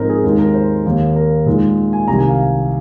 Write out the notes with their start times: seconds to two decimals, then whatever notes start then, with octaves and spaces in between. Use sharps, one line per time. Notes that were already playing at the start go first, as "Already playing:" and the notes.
Already playing: G#2 F3 C4 D#4 A#4
0.09 G#4
0.24 D#2 D#3 G#3 D#4 A#4
0.39 A#4
0.54 C5
0.86 D#2 D#3 A#3
1.16 A#4
1.46 A#2 G#3 D#4
1.93 G#5
2.08 C2 C3 D#3 A#5
2.19 G#5
2.29 F5